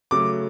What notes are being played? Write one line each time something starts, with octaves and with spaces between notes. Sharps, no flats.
C#3 F#3 A3 D6